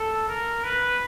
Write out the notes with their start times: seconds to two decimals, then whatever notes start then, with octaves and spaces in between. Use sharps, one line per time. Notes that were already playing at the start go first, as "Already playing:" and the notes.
Already playing: A4
0.29 A#4
0.64 B4